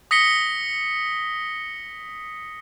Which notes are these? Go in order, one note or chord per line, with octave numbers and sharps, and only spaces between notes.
D#6 A#6 B6 C#7 G7